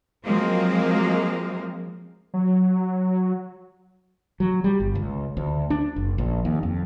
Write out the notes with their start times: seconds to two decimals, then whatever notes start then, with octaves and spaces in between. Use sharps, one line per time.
0.25 F3 F#3 G#3 A#3 C4
2.34 F#3
4.40 F#3
4.64 G3
4.80 G1
4.95 C#2
5.37 D2
5.70 D4
5.96 F#1
6.18 A#1
6.45 D#2
6.63 F2